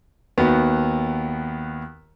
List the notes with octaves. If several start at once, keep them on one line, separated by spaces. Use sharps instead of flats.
D#2 B3 F#4